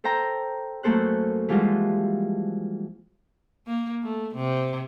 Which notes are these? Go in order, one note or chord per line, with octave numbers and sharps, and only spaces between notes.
A4 C5 G5 A#5
F#2 A3 A#3 A4 C5 F#6
E3 F3 G3 G#3 F4 F#4
A#3
A3
C3